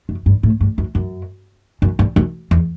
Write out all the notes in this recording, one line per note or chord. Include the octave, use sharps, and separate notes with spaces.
F#2
G2
A2
G2
F#2
F#2
F#2
G2
F#2
E2